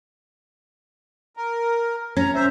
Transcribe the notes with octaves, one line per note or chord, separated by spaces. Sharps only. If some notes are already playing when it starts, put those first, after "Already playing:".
A#4
C#4 A#5
C5 E5